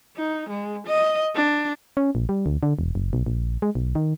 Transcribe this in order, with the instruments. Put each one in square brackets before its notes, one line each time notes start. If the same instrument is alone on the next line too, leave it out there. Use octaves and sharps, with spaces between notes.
[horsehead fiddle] D#4
G#3
D#5
D4
[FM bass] C#4
A#1
G3
D2
D3
E1
F#1
B1
A#1
G#3
B1
D#3